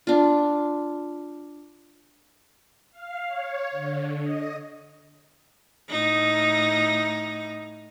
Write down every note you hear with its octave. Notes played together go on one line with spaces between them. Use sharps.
D4 F4
F5
C#5
D3
D#5
A2 D#4